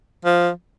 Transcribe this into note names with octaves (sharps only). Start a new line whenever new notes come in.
F3